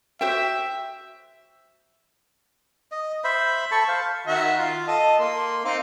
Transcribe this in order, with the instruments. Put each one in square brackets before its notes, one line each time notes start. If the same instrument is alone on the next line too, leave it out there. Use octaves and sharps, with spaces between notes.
[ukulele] F#4 C5 G5 [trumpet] E5
[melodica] D#5
C5 E5 B5
A4 A5 B5 C#6
C5 F5
[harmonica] D#3 F#4 E5
F4
A4 D#5
A#3 C6
C4 D#4 F5